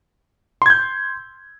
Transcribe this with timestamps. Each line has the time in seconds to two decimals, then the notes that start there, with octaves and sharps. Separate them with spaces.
0.62 C6
0.66 G#6
0.70 G6